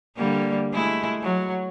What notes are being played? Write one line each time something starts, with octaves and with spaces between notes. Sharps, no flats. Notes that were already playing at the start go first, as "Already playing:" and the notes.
D3 G3 A#3
G#3 A3 E4
F#3